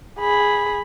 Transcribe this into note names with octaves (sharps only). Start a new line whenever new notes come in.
G#4 B5